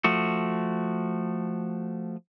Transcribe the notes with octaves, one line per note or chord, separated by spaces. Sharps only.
F3 A3 F#4